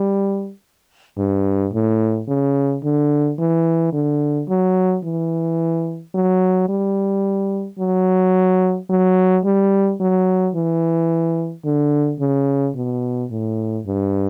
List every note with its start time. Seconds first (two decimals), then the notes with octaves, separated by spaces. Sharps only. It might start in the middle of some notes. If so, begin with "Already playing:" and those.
Already playing: G3
1.18 G2
1.73 A2
2.28 C#3
2.83 D3
3.39 E3
3.93 D3
4.49 F#3
5.04 E3
6.15 F#3
6.69 G3
7.79 F#3
8.90 F#3
9.45 G3
10.00 F#3
10.55 E3
11.65 D3
12.20 C#3
12.75 B2
13.30 A2
13.86 G2